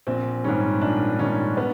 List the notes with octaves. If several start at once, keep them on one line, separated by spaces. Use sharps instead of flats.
A#1 C4
G#2 D#3 G3 C#4
A#1 D4
G#2 D#3 G3 C#4
B3